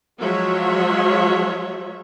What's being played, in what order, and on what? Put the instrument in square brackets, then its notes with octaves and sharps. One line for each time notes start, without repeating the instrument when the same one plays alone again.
[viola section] F3 F#3 G#3 F#4 C#5 E5